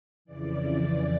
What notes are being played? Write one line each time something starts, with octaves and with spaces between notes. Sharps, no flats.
F2 C#3 E3 D5